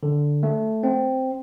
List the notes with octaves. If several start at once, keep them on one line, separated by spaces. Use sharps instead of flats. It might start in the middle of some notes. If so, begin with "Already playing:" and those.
D3
A3
C4